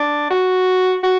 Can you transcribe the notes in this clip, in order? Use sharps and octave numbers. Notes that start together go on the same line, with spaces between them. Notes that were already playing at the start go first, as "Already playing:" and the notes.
Already playing: D4
F#4
F#4